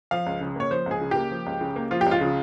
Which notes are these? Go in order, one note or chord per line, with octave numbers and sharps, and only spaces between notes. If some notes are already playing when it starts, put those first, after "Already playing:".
F3 F5
C#2
C#3
A#3 C#5
F3 C5
C#2
G#4
C#3
A#3 G4
F3
C#2
C#3
A#3
F3 F4
G4
C#2
F4
C#3